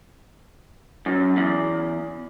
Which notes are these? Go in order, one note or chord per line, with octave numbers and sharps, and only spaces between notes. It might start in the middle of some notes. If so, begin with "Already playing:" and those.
F#2
E2